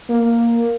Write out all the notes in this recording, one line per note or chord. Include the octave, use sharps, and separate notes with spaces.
A#3